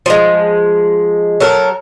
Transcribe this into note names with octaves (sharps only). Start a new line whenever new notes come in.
F3 G#3
F#3 A4 A#4